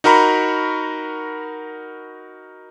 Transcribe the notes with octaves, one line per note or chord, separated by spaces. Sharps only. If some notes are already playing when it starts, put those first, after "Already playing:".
D#4 F#4 A#4 A#5 B5 C#6